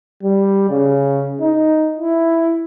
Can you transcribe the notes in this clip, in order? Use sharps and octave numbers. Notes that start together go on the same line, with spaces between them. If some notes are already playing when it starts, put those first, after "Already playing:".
G3
C#3
D#4
E4